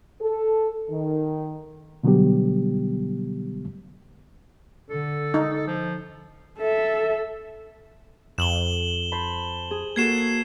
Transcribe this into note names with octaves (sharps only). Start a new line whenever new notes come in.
A4
D#3
B2 D3 F#3 G3 B3 G4
D3 A4
D#4
F3
A4 E5
F2 E7 F#7 G7
C5 A5 B5
G#4
A#3 F#4 A4 G#6 C7 E7
C7